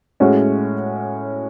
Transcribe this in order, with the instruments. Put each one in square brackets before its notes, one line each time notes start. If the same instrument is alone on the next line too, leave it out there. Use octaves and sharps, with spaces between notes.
[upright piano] A2 G#3 C#4 F#4